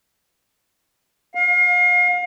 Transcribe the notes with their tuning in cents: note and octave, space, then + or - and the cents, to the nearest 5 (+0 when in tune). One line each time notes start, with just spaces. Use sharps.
F5 +35